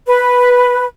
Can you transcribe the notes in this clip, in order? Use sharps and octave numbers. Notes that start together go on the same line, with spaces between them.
B4